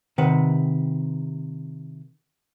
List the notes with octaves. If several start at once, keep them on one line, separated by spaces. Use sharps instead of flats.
C3 D#3 B4 F#5